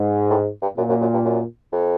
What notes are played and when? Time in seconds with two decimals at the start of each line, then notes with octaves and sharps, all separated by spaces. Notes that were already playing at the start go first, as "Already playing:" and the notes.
Already playing: G#2
0.30 A2
0.62 G2
0.77 F#2 A#2
0.89 F#2
1.01 F#2
1.13 G2
1.25 F#2
1.72 F2